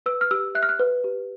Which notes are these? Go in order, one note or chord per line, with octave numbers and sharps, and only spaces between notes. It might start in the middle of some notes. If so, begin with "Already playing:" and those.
B4 E6
F6
G4 E6
E5 F#6
F6
F#6
B4
G4